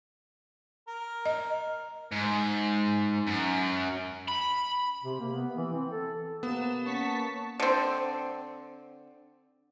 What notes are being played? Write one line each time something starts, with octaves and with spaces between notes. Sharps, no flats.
A#4
D#5
G#2
F#2
B5
C3
A#3
B3
E3
C4
A4
C3 A#3 B3 E7
A#3 C#4 A5 C#6 B6
D3 C4